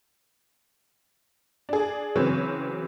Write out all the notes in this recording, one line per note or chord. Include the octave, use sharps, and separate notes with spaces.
D4 G#4
C#3 E3 F#3 C4 B4 C#5